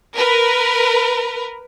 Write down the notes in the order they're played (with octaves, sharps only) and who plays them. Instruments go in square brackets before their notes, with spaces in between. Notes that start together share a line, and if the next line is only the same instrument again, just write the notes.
[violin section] A#4 B4